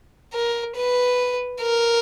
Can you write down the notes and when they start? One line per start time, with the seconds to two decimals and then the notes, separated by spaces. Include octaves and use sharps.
0.34 A#4
0.76 B4
1.61 A#4